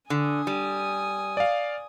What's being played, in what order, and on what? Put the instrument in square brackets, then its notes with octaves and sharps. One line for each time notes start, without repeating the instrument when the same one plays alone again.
[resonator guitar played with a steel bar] D3 [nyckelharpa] G#5 D#6
[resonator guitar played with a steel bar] G3
[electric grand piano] D5 F5